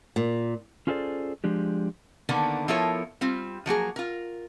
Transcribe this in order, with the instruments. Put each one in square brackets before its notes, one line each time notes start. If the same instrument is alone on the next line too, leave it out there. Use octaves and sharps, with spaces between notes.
[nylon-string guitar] A#2
[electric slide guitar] C#4 F4 G#4 A4 C5 D5
F3 G#3 D4 G4
[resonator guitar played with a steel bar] D3 D#3 A#3 B3 D4
F3 B3 E4 A4 A#4 C#5
G3 C4 F4
F3 F#3 A#3 G#4
F4 A#4